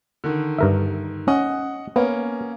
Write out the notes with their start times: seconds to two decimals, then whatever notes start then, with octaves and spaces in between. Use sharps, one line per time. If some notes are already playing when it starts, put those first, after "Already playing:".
0.24 D3 D#3
0.58 G2 A#4 E5
1.28 C#4 D#5 F#5
1.96 A#3 B3 C#4